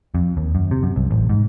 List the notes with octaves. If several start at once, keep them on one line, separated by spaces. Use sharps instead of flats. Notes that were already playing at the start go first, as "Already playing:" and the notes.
F2
D#2
F#2
C3
F#2
C2
A1
G#2